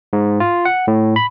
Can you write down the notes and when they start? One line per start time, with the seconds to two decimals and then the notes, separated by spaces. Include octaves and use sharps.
0.13 G#2
0.40 F4
0.65 F#5
0.88 A2
1.16 B5